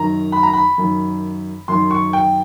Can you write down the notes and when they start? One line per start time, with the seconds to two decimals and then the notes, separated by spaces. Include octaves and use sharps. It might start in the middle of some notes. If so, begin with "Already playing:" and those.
Already playing: F#2 D#3 A#5
0.32 B5
0.43 A#5
0.53 B5
0.78 F#2 D#3
1.68 F#2 D#3 C6
1.91 C#6
2.13 G5